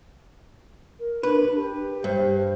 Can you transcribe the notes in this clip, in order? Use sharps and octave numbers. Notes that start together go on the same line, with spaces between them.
A#4
D4 B4
G4
G2 C5